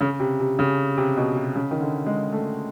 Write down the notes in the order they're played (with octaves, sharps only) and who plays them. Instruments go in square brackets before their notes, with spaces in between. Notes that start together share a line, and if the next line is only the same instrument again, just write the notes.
[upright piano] C#3
C3
C3
C#3
C3
B2
C3
C#3
D#3
D3
G#3
A3